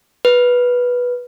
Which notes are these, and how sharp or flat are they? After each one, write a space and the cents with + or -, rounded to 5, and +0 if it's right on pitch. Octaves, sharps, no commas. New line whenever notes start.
B4 -10